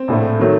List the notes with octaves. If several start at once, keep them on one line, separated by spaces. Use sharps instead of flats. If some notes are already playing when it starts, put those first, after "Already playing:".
Already playing: C4
A#1 A2 A3
D#3 F#3 A3